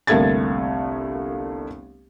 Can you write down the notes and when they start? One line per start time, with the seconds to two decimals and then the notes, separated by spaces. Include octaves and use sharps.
0.07 G1 C2 A3 A#3 G#6 A6